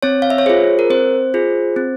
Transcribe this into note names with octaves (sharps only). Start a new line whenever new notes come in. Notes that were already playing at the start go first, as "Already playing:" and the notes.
C4 C#5
F5
E5
C#5
F4 G#4 C5
A#4
C4 C5
F4 G#4
C4